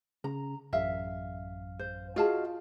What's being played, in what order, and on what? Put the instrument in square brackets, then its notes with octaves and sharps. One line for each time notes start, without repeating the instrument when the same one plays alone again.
[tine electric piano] C#3 [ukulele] A#5
[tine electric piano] A1 F#2 F5 [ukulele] E5
[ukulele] C5
[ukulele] F4 G#4 A5 [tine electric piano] F#4 D#5 F5